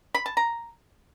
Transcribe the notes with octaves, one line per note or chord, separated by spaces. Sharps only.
B5
A5
A#5